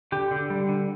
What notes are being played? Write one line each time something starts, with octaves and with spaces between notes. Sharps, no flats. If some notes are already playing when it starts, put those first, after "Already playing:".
D3 G4
D3
G3
D3